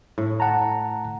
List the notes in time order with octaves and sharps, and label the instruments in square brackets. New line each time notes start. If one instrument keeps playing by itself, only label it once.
[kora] A2
[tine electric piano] F#5 A5 A#5